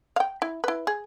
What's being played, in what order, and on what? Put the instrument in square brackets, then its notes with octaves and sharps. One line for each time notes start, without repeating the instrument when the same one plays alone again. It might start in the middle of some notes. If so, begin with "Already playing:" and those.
[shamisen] F5 G5
E4
E4 B4
G#4